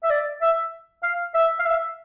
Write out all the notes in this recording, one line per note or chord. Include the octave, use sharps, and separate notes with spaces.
E5
D5
E5
F5
E5
F5
E5